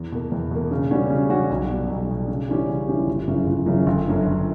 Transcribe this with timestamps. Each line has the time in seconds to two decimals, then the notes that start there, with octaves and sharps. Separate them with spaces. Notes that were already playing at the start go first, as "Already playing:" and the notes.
Already playing: E2
0.12 B2 A#3
0.32 E2
0.51 B2 A#3
0.71 C#3
0.91 G3 C#4 F#4
1.10 C#3
1.30 G3 C#4 F#4
1.50 B1
1.70 B2 G3
1.90 B1
2.09 B2 G3
2.28 C#3
2.48 E3 G3 C#4 G4
2.69 C#3
2.88 E3 G3 C#4 G4
3.07 G1
3.28 F#2 C#3 E3
3.47 G1
3.66 F#2 C#3 E3
3.86 G1
4.06 F#2 D3
4.26 G1